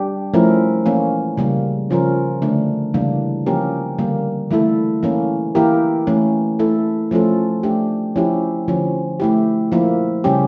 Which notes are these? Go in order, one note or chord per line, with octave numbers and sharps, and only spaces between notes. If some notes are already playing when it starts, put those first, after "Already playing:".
Already playing: G3 D4 G4
F3 A3 C#4 E4 A#4
E3 A#3 C#4
C#3 G3 A#3
C#3 F3 C#4 F4 A#4
D3 A3 D4
C#3 E3 G3 A#3 D4
F3 A#3 C#4 G4 A#4
D3 G3 A#3
E3 A3 E4 A4
E3 A#3 C#4
E3 A#3 E4 G4 A#4
E3 A3 C#4
A3 E4 A4
F3 A3 C#4 F4 A4
A3 D4 G4
F3 C#4 E4 G4
D3 F3 C#4
A3 E4 G4
F3 A#3 E4
C#3 G3 C#4 G4